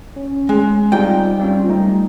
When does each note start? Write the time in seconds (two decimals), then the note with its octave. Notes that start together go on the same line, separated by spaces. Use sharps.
0.16 C#4
0.49 G#3
0.92 G3 C4 D#4 F4 G5
1.39 G3 C4 C#4 F4
1.69 G3 A3 D#4